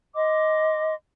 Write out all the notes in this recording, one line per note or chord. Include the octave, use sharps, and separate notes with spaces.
D#5 C6 D6